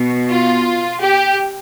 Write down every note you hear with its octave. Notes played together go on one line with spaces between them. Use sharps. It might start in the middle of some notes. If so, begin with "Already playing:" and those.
Already playing: B2
F4
G4